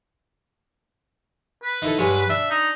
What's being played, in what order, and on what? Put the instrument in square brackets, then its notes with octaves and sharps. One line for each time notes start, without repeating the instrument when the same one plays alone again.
[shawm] B4
[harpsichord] D#4 E4 A4
G2 F#3 G#3
[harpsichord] D4 [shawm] E5
[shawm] D#4